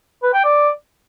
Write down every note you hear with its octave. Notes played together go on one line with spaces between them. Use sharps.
B4
G5
D5